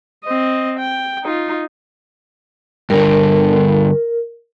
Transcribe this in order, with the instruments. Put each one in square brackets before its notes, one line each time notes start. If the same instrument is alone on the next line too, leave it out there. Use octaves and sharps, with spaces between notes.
[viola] C4 D#5
G5
D#4 F4
[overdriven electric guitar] G2 D3 [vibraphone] A#4